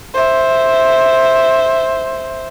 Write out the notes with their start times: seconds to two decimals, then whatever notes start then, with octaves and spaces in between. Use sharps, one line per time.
0.14 C5 E5